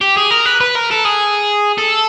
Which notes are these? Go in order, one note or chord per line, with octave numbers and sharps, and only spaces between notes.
G4
G#4
A#4
B4
B4
A#4
A4
G#4
A4